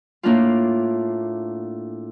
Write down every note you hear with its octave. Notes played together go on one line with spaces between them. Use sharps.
A2 A#3 D4 F4